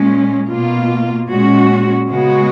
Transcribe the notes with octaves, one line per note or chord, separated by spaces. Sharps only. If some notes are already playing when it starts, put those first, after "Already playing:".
Already playing: A#2 G#3 C#4
B2 A#3 F4
A#2 G#3 C#4 F#4
C#3 G#3 B3 F#4